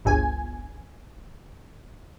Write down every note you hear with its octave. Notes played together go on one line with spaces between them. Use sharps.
G1 C#2 G#5